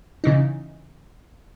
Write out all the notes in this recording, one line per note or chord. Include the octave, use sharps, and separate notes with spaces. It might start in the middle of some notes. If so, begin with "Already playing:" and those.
C#3 E3 D#4